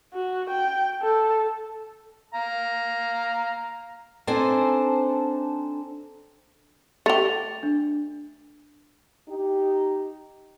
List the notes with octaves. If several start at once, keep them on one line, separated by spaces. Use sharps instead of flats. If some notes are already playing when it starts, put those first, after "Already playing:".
F#4
G5
A4
F5 A#5
C4 D4 D#4 A4 C5 G#5
A3 G4 A6 F7
D4
D#4 G4